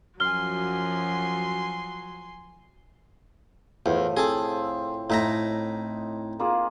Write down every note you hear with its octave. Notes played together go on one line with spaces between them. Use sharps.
F#2 F3 F#3 G#5 C6 F6 G7
E2 A2 F3
C4 G#4 A4
A2 D#4 E5 A#5
A#3 F4 G#4